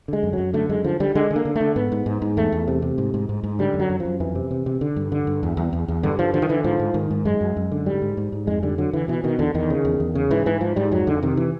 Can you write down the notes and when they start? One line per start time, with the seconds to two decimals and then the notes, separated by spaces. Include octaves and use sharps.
0.08 D3 G#3
0.23 F#2
0.33 F#3
0.38 F#2
0.54 D3 A3
0.69 F#2 G#3
0.84 D3 F3
1.00 D3 G3
1.15 D3 G#3
1.31 D3
1.36 A#3
1.45 D3
1.56 A3
1.61 D3
1.76 G#2 B3
1.92 G#2
2.06 G#2
2.22 G#2
2.37 E2 A3
2.52 E2
2.68 C3
2.82 C3
2.98 G#2
3.14 G#2
3.29 G#2
3.44 G#2
3.59 D3 G3
3.74 F#2
3.80 F#3
3.90 F#2
4.00 F#2 F3
4.20 F2 E3
4.35 C3
4.51 C3
4.66 C3
4.81 D3
4.96 G2
5.12 D3
5.27 G2
5.43 E2
5.57 E2
5.73 E2
5.88 E2
6.03 G2 D3
6.19 D3 F3
6.34 D3 F3
6.42 D#3
6.49 D3 E3
6.64 G#2 F3
6.80 G#2
6.94 G#2 D#3
7.11 G#2
7.25 F#2 G#3
7.41 F#2
7.57 F#2
7.72 D3
7.86 G#2 G3
8.02 G#2
8.17 G#2
8.32 G#2
8.47 F2 G#3
8.63 D3 G3
8.78 D3 F#3
8.93 D3 E3
9.08 B2 E3
9.24 B2 D#3
9.39 E2 D3
9.54 E2 D#3
9.70 C#3
9.85 E2
10.00 E2
10.15 C#3
10.31 G#2 E3
10.46 G#2 E3
10.61 G#2 F3
10.76 G#2 G3
10.92 F2 F#3
11.07 F2 D3
11.22 C3 D#3
11.37 E3